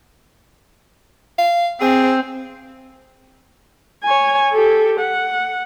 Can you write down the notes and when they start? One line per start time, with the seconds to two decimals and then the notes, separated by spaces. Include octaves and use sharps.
1.39 F5
1.81 C4 G#4
4.04 C#5 G#5
4.52 G4 A4
5.00 F#5